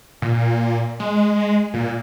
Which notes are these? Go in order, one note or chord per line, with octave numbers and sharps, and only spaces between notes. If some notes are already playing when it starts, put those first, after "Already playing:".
A#2
G#3
A#2